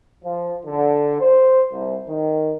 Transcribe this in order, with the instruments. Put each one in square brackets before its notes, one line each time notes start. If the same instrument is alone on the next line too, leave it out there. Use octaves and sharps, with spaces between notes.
[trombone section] F3
D3
C5
C2
D#3